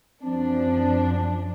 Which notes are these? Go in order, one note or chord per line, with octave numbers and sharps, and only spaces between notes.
F#2 F3 C4 D4